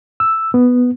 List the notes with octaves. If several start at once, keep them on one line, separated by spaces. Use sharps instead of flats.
E6
B3